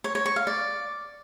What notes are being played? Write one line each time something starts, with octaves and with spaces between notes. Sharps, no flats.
C#5
C#5
C#6
F5
D5